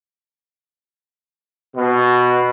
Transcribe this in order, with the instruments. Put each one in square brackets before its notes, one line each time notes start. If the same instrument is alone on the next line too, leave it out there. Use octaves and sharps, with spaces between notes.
[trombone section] B2